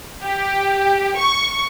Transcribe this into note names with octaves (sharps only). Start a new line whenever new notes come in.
G4
C#6